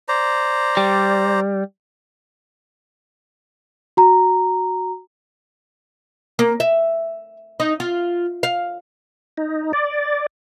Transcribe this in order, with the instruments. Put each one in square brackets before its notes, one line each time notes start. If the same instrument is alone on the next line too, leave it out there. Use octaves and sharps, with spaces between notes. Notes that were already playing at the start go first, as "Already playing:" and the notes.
[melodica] C5 D5 A#5
[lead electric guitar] G3
[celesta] F#4 A#5
[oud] A#3
E5
D#4
F4
F5
[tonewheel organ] D#4
D5